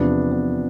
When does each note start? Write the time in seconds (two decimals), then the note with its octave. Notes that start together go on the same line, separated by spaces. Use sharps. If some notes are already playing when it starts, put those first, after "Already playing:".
Already playing: E2 C3 F3 B3 D4
0.32 B3